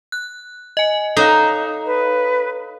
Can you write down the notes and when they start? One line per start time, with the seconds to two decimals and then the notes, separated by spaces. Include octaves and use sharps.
0.12 F#6
0.77 D#5 G#5
1.17 D#4 A4 C#5 F5
1.86 B4